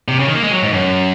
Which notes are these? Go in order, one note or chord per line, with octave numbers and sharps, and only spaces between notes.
C3
C#3
D#3
A#3
G#3
F#3
G#2
F#2